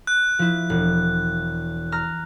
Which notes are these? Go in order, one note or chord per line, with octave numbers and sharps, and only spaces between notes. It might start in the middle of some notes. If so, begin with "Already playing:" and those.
F#6
F3 E4
E1
A#5 F6